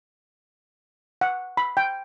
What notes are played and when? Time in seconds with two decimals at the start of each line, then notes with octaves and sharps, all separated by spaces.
1.21 F#5
1.57 B5
1.77 G5